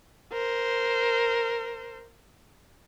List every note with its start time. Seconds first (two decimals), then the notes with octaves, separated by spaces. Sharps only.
0.32 A#4 C5